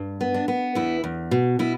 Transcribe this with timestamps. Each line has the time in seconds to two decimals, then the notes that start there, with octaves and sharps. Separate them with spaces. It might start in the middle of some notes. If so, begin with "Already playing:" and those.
Already playing: G2
0.21 B3
0.34 D4
0.48 B3
0.75 E2 E4
1.04 E2
1.31 B2
1.59 B2 E4